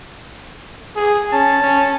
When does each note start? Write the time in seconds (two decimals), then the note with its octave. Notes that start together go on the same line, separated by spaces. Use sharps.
0.96 G#4
1.32 C#4 A5
1.62 C#4